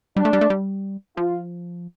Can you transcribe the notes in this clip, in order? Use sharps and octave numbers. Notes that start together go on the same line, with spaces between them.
G3 D4
A3
G3
A3
G3
F3 F4